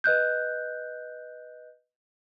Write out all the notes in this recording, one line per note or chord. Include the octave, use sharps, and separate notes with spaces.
B4 D#5 F#6 G6